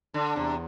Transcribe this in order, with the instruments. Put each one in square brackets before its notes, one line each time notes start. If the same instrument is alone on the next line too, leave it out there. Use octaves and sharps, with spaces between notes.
[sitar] D3 [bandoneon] D4
[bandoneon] E2 [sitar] C3